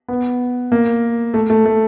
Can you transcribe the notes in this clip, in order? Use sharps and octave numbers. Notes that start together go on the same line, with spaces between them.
B3
A#3
A3
A3
A3